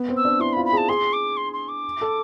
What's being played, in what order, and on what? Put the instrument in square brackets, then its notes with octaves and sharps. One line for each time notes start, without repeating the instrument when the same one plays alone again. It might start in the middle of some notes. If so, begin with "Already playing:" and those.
Already playing: [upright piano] B3
C4
[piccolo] E6
[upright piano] D4
[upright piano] E4 [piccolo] C6
[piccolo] B5
[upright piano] F4
[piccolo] B5
[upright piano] G#4 [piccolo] A5
[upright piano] G#4 [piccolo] C6
[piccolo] D6
C6
C6
D6
[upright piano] A4